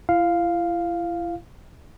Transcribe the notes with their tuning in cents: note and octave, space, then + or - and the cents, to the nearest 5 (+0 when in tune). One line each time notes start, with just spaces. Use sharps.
E4 +40 F5 +0